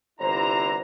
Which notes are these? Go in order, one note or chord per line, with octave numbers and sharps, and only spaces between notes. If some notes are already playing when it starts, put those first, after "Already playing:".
G1 C2 D3 E4 C5 A#5